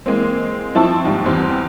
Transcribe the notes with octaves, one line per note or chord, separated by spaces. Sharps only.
E3 G#3 A#3 C4
F3 C4 E4 A5 C#6 E6
D#2 G#2 F3 G3
E2 E3 G3 C4